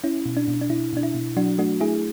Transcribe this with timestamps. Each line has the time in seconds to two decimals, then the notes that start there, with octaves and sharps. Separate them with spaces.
0.04 C#4 E4
0.26 B2
0.37 D4
0.48 B2
0.61 D4
0.70 B2 E4
0.93 B2 D4
1.03 E4
1.14 B2
1.37 F#3 D4 F#4
1.58 A3 D4 F#4
1.80 A3 E4 G#4